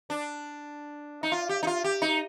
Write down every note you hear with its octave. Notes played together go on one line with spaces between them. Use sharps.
D4
D#4
F4
G4
D#4
F4
G4
D#4